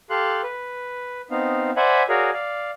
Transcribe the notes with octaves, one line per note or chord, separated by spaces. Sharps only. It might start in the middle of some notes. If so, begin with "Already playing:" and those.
G4 A4 F5 C6 F#6
B4
B3 C4 D#4 F5
C5 D5 E5 F#5 G#5 B5
F#4 G#4 A#4 C#5 D5 F5
D5 F5